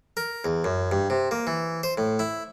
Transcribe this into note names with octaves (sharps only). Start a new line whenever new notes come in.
A#4
E2
F#2
G2
C3
A#3
E3
C5
A2
E4